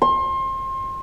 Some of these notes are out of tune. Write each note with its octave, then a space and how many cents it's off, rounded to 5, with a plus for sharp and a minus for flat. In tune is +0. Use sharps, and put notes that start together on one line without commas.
C6 +30